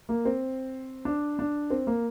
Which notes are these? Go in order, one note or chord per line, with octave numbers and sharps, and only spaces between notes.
A#3
C4
D4
D4
C4
A#3